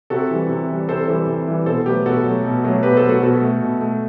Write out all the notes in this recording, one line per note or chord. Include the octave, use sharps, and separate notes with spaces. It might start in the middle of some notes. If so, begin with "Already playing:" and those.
C3 F#4 A4
E3 G3
C3
E3 G3
C3 A4 C5
E3 G3 A4 C5
C3
E3 G3
B2 A4 C5
F#3 A3 G4 B4
B2 F#4 A4
F#3 A3
B2
F#3 A3
B2 G4 B4
A4 C5
F#3 A3
F#4 A4
B2 F#4 A4
A3
B2
A3